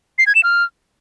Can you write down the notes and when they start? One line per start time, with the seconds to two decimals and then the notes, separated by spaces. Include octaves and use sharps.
0.18 C7
0.27 G#6
0.35 E7
0.43 F6